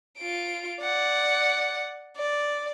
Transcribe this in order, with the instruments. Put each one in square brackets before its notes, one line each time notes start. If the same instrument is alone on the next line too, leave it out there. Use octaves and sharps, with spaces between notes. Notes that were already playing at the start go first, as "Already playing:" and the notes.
[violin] F4 D7
D5 F#5
D5